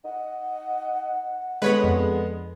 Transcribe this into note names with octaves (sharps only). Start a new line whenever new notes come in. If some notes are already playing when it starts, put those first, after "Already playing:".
D#4 F#5
D3 G#3 B3 B4 C#5 B5
F2